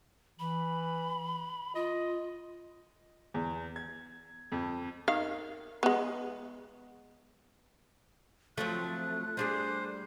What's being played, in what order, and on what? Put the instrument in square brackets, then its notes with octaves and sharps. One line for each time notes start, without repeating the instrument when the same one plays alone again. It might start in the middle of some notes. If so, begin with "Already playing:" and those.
[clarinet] E3 [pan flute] B5
[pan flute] F4 [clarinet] D#5
[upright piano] E2
G#6
F2
[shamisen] D#3 F5
G#3 B3
[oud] F3 F#3 C4 [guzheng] A3 [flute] F#6
[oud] G3 D4 G#4 [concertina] C5